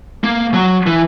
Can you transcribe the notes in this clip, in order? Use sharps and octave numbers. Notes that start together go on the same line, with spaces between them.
A#3
F#3
E3